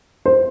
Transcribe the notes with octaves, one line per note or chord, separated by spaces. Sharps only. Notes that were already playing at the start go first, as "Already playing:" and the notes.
C5